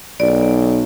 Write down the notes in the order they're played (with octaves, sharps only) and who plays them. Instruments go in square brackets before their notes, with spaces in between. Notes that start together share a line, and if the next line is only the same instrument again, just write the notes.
[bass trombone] B1 [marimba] D5